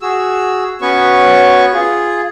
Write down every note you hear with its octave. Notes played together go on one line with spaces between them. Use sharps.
F#4 G#4 E6
B3 C#4 F#4 B4 C#5 C#6
F4 G#4